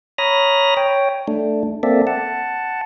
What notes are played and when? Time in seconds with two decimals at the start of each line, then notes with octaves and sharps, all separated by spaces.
0.18 C#5 A#5 B5 D#6 F6 A#6
0.77 C#5 G5
1.28 A3 D4
1.83 A#3 C4 A4 D5 E5
2.07 F#5 A5